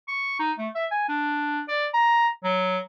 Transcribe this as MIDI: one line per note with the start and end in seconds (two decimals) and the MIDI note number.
0.08 0.37 85
0.39 0.52 63
0.58 0.68 57
0.75 0.86 76
0.91 1.08 80
1.08 1.61 62
1.68 1.86 74
1.93 2.28 82
2.44 2.79 54